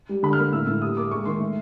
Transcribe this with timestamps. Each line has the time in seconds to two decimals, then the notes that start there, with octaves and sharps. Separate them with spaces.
0.09 G3
0.23 D3 B5
0.33 F6
0.38 A#3
0.53 A2 E6
0.67 A2
0.82 G3 D#6
0.97 A#3 D6
1.11 G#3 C#6
1.25 D#3 C6
1.40 A3